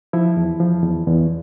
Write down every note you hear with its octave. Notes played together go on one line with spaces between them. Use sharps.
F3 E4
E2
F3
E2
E2